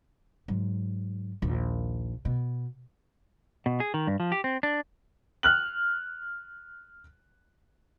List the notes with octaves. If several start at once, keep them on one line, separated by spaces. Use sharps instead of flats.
G#2 F#3
A#1 D#2
B2
B2
G#4
D#3
G2
F3
G4
C4
D4
F6 F#6 F#7